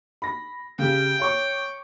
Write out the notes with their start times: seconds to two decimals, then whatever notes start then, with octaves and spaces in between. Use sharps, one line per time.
0.22 B5 A#6
0.79 C#3 G4 G5
1.20 C#5 C#6 D6